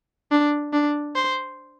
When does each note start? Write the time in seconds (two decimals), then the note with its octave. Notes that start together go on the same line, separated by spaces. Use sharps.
0.31 D4
0.73 D4
1.16 C5